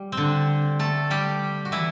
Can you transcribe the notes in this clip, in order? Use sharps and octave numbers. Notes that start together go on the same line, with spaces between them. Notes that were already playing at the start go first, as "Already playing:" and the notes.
Already playing: G3
C4
D3 D4
A3 A4
G3 G4
F#4
E3 E4